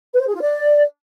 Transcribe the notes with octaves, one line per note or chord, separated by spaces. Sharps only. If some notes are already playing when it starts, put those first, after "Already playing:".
B4
C5
G#4
F4
D5